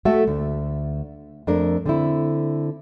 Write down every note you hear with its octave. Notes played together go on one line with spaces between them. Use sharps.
A3 F#4 A4 E5
D2
F2 A3 D4 A#4
D3 C4 E4